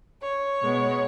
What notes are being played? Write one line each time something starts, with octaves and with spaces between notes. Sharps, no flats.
C#5
B2 G#3 B3